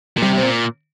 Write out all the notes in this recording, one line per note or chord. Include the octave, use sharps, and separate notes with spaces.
A#2
C3 G3
C3 C4
A#2